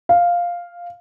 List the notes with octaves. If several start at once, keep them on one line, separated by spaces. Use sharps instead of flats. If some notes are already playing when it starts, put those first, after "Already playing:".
F5